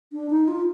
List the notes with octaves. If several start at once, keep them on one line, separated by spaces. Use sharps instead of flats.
D4
D#4
F4